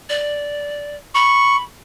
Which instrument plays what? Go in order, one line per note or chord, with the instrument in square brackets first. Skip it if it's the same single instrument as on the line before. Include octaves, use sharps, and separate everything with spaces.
[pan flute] D5
[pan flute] B5 [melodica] C#6